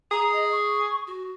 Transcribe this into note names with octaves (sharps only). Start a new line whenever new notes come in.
G#4 A#5
D#5
C#6
F#4